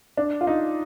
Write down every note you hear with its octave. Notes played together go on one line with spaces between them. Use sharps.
D4
F4
D#4